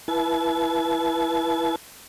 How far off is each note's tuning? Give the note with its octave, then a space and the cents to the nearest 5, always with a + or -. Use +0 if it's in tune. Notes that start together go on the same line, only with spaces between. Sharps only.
E4 +15 B4 -25 A5 -40